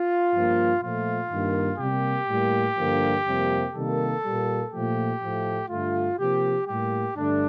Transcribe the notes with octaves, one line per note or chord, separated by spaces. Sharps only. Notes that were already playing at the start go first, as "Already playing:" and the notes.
Already playing: F4
G2 F3 A#3
A#2 F3 A3 F4
G2 D#3 A#3
C3 G3 A#3 G4
A2 G3 A#3
G2 D3 F3 A#3
F2 C3 G3 A#3
C3 D#3 G3 A#3 A4
A#2 G3 A#3
A#2 F3 A3 G4
A2 F3 A3
G2 D3 A3 F4
C3 F3 A#3 G4
A2 G3 A#3 G4
G2 D3 A3 D4